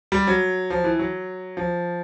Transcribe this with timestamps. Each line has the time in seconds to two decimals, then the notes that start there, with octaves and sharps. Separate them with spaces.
0.12 G3
0.27 F#3
0.70 F3
0.84 E3
0.99 F#3
1.57 F3